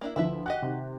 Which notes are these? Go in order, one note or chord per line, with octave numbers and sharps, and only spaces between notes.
A#3 D4 E4
D2 F3 E4 B4 E5
F#4 G4 D#5 F#6
C3 D#3